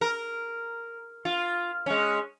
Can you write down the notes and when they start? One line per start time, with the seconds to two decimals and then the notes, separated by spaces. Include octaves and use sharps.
0.01 A#4
1.25 F4
1.86 G#3 C#4